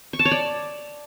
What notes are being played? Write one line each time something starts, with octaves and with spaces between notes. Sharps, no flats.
C#6
A5
C#5
D5